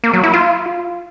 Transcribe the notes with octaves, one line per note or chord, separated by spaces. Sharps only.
A#3
F#3
E4
F4